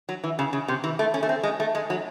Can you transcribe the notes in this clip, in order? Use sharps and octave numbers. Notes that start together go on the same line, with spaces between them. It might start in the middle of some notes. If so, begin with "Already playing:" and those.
F#3
E3
C#3
C#3
C3
E3
A3
C#4
A3
C4
G#3
A3
G#3
F#3